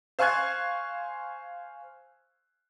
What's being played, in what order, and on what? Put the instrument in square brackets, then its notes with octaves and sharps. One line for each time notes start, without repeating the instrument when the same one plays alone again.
[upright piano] C5 F5 G#5 C#6 F#6 G#6